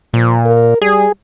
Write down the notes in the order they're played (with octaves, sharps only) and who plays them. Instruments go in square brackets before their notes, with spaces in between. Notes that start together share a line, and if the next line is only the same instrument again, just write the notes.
[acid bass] A#2 [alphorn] F3
[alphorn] A#4
[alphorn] G3 [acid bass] G#4